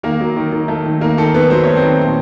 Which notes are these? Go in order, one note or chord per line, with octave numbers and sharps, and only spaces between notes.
D#3 A#3 A#4
F#3
D#3
D#3
A3
D#3
D#3 A#3 A#4
D#3 A4
D#3 B3 B4
F#3 C5
A3 C#5
C4 C5
D#3
A#2